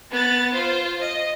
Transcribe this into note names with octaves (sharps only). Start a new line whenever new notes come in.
B3 A6
F4 C5
D#5